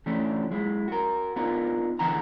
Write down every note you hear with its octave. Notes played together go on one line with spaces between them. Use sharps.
E3 A3 C#4 D4
F#3 G#3 E4
F#4 A#4
B3 D4 D#4 F4 A#4
E2 D3 E3 F#5 A#5